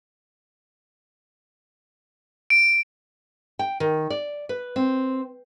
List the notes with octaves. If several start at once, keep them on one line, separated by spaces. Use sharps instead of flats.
D7
G5
D#3
D5
B4
C4